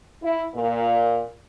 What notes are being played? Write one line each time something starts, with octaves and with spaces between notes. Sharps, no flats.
E4
A#2